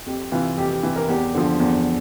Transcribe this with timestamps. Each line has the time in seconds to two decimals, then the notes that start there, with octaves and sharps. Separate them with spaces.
0.06 F2 G4
0.32 C3 E3 F4
0.57 F2 G4
0.70 G4
0.83 C3 E3
0.96 A#4
1.09 E2 G4
1.35 D3 F3
1.60 E2